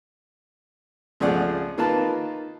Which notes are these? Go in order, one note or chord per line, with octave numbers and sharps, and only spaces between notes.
C#2 F3 A3 G#4 D5 F#5
D#3 A#3 F4 B4 A5